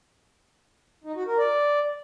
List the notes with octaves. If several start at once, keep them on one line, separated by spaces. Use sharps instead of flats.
D#4
F#4
A#4
D5